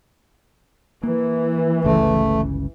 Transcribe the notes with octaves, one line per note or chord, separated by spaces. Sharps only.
E3 A#3
G1 C#2 C#3 A3